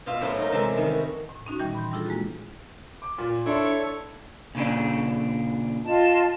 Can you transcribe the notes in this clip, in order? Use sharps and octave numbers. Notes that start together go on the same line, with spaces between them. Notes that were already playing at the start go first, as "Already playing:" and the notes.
B2 F4 E5
A2 F#3 A3 C#4 B4 C5
D#4 A#4
C3 E3 G#3 A3
D#3 G3
F#4
A2
C#4 D#4 F#4
A#2 D#3 E3 G3 G5
B5 C6 G6
G3 D4 E4 F4 G#4 A4
G#3 A#3 F#4
D6
A#2
D4 E4 A4 C#5 C6 C#6
A#2 C#3 D4
F4 D#5 A5